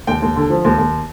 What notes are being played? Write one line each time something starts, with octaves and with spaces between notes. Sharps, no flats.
D#2 G5
D#2
D3
F3
D#2
D#2